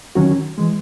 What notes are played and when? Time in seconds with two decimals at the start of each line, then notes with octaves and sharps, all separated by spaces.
0.15 D#3 F#3 C#4 F#4
0.58 E3 G#3